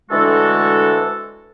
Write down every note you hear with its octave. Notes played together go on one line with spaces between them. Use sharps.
D2 D3 E3 G#3 F#4 A4